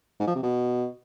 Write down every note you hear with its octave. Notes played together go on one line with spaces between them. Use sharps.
G#2
F3
C3
B2